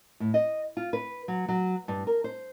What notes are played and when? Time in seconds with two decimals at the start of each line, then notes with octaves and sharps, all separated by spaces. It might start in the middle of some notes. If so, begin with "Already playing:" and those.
0.20 A2
0.34 D#5
0.77 F4
0.93 B4
1.28 F#3
1.49 F#3
1.88 G2
2.07 A#4
2.24 C5